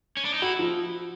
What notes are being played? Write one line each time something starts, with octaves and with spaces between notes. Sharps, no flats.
C#4
D4
D#4
E4 F#4
F3